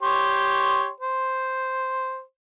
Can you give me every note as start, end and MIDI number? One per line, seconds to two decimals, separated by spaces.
0.03 0.90 67
0.03 0.90 73
0.03 0.90 84
1.00 2.22 72